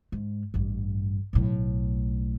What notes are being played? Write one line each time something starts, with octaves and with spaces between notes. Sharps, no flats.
G#2
A1 G2
B1 A2